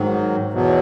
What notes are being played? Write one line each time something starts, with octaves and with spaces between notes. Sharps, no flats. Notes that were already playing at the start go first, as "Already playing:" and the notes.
Already playing: G#2 D#3 F#3
E2 B2 F#3